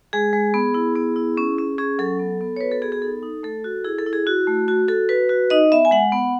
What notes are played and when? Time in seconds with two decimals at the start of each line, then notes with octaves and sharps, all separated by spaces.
0.13 G#3 G#4
0.33 G#3
0.54 B3
0.74 E4
0.96 B3
1.16 E4
1.37 C#4
1.58 C#4
1.78 C#4 G#4
1.99 F#3 A4
2.19 B3
2.41 B3
2.56 C#5
2.61 F#4 B4
2.72 A4
2.82 B3 G#4
2.92 G#4
3.02 D#4 A4
3.23 D#4
3.43 A3 A4
3.64 F#4
3.85 E4 G#4
3.99 A4
4.06 E4
4.13 G#4
4.26 E4 F#4
4.47 A3
4.68 F#4
4.88 F#4 A4
5.09 F#4 B4
5.29 F#4
5.50 D#4 D#5
5.72 B3 E5
5.85 G#5
5.91 G#3 F#5
6.12 B3